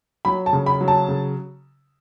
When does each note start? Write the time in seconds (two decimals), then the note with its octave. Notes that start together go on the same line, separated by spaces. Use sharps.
0.25 F#3 B5
0.46 A5
0.53 C#3
0.66 B5
0.81 F#3
0.88 A5
1.08 C#3